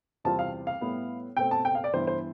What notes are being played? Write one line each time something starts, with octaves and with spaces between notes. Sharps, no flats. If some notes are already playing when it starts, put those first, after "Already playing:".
E2 C3 G3 C4 F4 A5
F5
F5
A2 G3 B3 E4
B2 A3 C4 G5
A5
G5
F5
D5
G2 E3 B3 E4 C5
C5